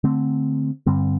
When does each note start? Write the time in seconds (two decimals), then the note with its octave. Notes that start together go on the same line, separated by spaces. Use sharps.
0.04 D3 A3 C4
0.86 G2 D3 G3 C4